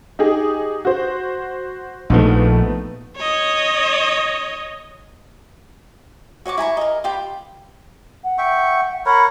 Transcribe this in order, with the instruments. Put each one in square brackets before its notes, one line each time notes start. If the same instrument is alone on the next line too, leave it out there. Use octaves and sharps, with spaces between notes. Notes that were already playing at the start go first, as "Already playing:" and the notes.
[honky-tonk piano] D#4 G4 G#4
F#4 C5
[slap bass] A#1 F3 [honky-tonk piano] A3 B3 D#4
[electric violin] C#5 D#5
[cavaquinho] F#4 C#5 C#6 D6
E4 G#5 A#5 C#6
A#4 D#5
F4 G4 G5 B5
[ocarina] F#5
[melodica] E5 G5 C#6
[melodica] A#4 C#5 F#5 [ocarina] B5